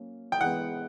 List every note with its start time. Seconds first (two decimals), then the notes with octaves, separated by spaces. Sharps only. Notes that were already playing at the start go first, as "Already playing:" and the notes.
Already playing: F#3 A#3 C#4
0.32 G5
0.41 E3 G#3 B3 F#5